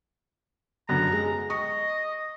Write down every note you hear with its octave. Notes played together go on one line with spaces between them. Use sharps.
F#2 D3 B3 A#5
G#3
D#5 C#6